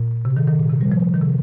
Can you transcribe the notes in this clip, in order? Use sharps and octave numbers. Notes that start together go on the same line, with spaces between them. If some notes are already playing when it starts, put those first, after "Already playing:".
Already playing: A#2
C3
D#3
D#3
A#2
C3
G3
F3
D#3
C3